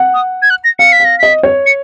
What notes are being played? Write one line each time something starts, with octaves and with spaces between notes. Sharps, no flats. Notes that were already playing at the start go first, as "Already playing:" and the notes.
Already playing: F#5
D#6
G#6
F#6
A#6
F5 C#7
B6
F5 A#6
D#5 B6
C#5
C#7